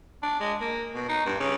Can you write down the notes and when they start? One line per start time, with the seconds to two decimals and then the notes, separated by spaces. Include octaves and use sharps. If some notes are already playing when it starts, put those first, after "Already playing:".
0.23 D4
0.40 G#3
0.61 A#3
0.94 B2
1.09 D#4
1.26 G2
1.40 C#3